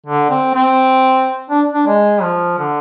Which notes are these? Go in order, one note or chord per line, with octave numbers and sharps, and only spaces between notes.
D3
C4
C4
D4
D4
G#3
F3
D3